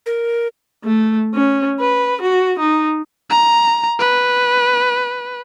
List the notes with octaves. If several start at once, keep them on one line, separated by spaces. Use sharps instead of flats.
A#4
A3
C#4
B4
F#4
D#4
A#5
B4